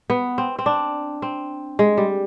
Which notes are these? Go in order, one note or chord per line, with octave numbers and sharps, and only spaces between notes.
B3
C4
C4
D4
C4
G#3
G3